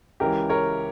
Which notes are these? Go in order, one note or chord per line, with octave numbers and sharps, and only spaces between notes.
C#2 C#3 E3 G#3 G4 A#4
A#4 C#5